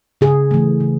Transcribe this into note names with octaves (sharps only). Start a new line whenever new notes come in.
C#3 G#4
E3 A3
C#3